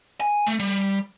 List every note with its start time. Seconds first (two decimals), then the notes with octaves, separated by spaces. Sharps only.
0.20 G#5
0.46 A3
0.60 G3